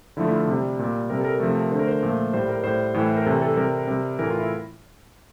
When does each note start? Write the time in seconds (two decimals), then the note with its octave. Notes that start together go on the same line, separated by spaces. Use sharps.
0.17 D3 F3 A3 E4
0.28 E4
0.32 F4
0.47 C3
0.53 G3
0.79 A#2 G3
1.10 C3 G3 A#4
1.21 A4
1.24 A#4
1.40 C3 F3 A3 A4
1.56 A#4
1.71 D3 A3 C5
1.79 A#4
1.88 C5
2.03 A#2 F3 A3
2.33 A2 G3 C5
2.49 A#4
2.64 A2 G3 C5
2.94 A2 E3 A3
3.17 A#4
3.26 C3 E3 G3 A4
3.42 A4
3.57 C3 G3 A#4
3.87 C3 G3
4.19 A2 E3 A3 A#4
4.30 F4
4.40 E4